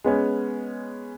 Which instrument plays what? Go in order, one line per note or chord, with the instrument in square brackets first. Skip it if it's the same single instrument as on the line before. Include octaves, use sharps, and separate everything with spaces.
[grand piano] G#3 B3 C#4